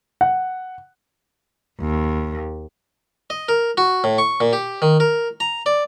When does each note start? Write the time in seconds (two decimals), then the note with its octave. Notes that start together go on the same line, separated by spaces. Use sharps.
0.21 F#5
1.80 D#2
3.30 D#5
3.49 A#4
3.77 F#4
4.04 A2
4.18 C#6
4.40 A#2
4.53 G4
4.82 D#3
5.00 A#4
5.40 A#5
5.66 D5